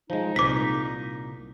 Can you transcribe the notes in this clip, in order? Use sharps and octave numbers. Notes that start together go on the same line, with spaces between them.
F3 G#3 D#4
C2 A#2 D6 B6